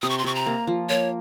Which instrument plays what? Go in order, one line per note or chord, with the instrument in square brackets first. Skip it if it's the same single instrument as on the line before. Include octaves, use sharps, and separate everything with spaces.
[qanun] C3 [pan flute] D#6
[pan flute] C#6
C6
[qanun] C3 [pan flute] C#6
[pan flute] A#5
[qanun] A#3
F3
[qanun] A#3 [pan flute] C#5